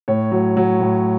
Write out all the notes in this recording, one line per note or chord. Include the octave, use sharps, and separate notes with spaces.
A2 C#5
F#3
F#3
A2